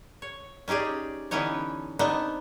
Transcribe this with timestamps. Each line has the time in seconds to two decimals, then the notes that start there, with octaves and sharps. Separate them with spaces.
0.22 C#5
0.68 C#4 D#4 G4 G#4 D5
1.31 D3 E3 B3 C#4 D#4 C#5
1.99 B3 C4 D4 D#4